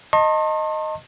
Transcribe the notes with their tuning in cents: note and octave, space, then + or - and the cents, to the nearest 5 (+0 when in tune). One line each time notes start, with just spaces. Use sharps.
D#5 +0 A5 +35 C6 +45